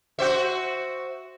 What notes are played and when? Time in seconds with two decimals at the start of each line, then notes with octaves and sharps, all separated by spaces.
0.19 F#4 C5 E5